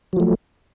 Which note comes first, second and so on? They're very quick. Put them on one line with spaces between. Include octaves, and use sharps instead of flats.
F#3 F3 A3